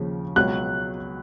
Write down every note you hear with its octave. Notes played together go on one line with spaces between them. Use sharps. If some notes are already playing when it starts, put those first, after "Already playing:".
Already playing: D#2 C#3 F3
C#2 B2 F#3 F#6